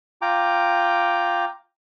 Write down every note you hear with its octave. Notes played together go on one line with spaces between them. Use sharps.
F4 G5 A#5 D6